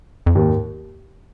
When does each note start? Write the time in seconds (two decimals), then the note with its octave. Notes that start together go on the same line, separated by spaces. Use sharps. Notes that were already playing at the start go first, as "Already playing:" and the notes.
0.26 F2
0.35 D#2 G#2